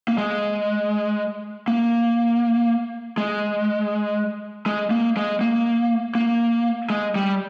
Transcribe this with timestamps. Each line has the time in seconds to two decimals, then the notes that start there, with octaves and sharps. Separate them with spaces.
0.08 A#3
0.18 G#3
1.68 A#3
3.17 G#3
4.66 G#3
4.91 A#3
5.17 G#3
5.41 A#3
6.15 A#3
6.90 G#3
7.16 G3